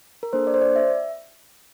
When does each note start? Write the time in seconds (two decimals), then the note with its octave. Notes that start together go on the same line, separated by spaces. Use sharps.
0.23 A#4
0.33 A#3 D4 A4 C5
0.47 D5
0.54 C5
0.62 D5
0.76 E5